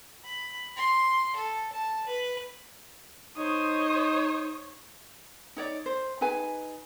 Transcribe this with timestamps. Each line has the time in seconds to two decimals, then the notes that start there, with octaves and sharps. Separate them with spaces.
0.25 B5
0.76 C6
1.36 A4
1.73 A5
2.07 B4
3.37 D#4 C5 C#5 D#6
5.56 D#4 C#5 D5
5.86 C5
6.21 D#4 G#4 B4 G#5